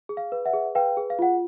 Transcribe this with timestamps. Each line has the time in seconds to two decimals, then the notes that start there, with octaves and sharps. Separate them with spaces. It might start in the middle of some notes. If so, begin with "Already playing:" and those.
0.09 G#4
0.17 F5
0.32 B4
0.45 E5 F#5
0.53 G#4
0.75 B4 F5 G5
0.97 G#4
1.10 F5
1.19 F4 F#5